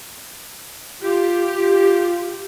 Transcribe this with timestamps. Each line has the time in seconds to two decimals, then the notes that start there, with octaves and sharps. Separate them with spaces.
1.02 F4 G4
1.55 F4